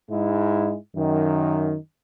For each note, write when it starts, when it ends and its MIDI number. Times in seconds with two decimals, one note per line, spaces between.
0.10 0.76 44
0.10 0.76 56
0.10 0.76 64
0.96 1.75 42
0.96 1.75 51